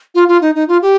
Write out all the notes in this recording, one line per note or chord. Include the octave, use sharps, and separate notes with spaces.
F4
F4
D#4
D#4
F4
G4